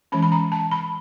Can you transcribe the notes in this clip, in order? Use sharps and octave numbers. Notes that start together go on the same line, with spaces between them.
E3 G#3 C#4 B5
B5
A#5
A5
B5